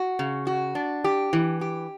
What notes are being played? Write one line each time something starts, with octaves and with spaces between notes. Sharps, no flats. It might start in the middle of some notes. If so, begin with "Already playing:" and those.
Already playing: F#4
C#3
F#4
D4
G4
E3
G4